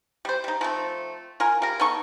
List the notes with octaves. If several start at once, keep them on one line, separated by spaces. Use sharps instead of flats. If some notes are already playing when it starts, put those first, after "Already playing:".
G3 C5
G3 D#4
F3 A3 C4
F4 A#4 G#5
G3 A#4
B3 D#4 A4 C#6